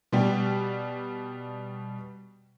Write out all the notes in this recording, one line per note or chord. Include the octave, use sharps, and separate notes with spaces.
B2 G3 G4